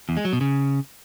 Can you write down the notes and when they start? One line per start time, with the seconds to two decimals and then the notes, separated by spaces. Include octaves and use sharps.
0.09 E2
0.17 G#3
0.25 F#3
0.33 B2
0.41 C#3